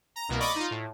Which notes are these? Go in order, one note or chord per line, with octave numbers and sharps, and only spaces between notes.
A#5
C2 B2 A#3
D5 D#5 B5 C#6 D6
D#4 F4
A2